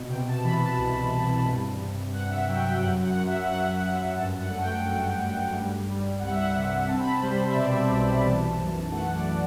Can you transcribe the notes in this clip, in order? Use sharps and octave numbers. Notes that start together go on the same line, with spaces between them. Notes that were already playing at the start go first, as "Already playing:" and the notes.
Already playing: B2
C3 G5
A5
E3 B5
A5
C2
C3
G2
G2
G2 F#5
E5
F#3 G5
G5
F#2 F#5
F#5
F#2
E5
F#3 F#5
F#2 F#5
G2 A5
F#5
A3
G5
A3
G2
G3
G3
C2 F#5
E5
F#5
C3
C4 A5
B5
A5
G3 C5
C5
E5
B2 D5
E5
B1
E3 A5
F#2
A3 F#5
D5